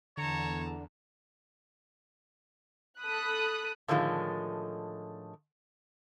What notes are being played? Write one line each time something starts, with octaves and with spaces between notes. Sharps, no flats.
E2 D3 C#5 A5 A#5
A4 B5 D#6 F#6
A2 D3 D#3 F3 G#3